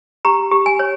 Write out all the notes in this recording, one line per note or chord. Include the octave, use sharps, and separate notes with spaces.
G4 A#5
G4
G#5
C#5